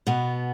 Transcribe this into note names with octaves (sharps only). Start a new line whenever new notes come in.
B2 B3